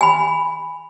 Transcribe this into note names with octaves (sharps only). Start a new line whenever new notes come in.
G#5 B5